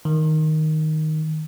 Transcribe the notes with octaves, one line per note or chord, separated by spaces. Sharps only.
D#3